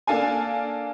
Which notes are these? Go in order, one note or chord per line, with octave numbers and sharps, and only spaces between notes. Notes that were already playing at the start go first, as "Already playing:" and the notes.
A#3 D4 A4 F5 G#5